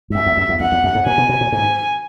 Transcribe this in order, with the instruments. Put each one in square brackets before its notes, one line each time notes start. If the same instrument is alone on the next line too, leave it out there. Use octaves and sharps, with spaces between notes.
[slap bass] G#2
[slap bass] F#2 [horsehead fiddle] E5
[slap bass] E2
F#2
E2
[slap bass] E2 [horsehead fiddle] F#5
[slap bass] E2
F#2
G#2
[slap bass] A#2 [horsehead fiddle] G#5
[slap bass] B2
B2
A#2
[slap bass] G#2 [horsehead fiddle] G#5